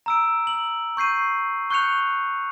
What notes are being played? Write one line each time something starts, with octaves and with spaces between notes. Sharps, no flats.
A#5 E6 D7
F#7
C#6 G6 C7 D#7
C#6 F#6 G6 C#7 F7